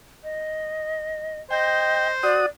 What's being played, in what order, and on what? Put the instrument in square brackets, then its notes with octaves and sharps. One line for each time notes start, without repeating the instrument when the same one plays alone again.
[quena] D#5
[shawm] C5 [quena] D#5 [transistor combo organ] G5
[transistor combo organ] F#4 D#6 [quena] D5